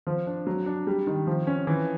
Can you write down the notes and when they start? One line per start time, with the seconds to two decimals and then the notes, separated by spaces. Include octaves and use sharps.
0.07 F3
0.27 D4
0.47 F#3
0.66 D4
0.87 G3
1.07 D#3
1.27 F3
1.47 C#4
1.67 E3